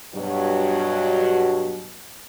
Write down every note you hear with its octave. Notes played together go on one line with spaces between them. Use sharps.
G2 B2 F#3